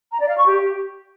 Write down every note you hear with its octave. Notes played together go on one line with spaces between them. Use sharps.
A#5
D5
F5
C#6
G4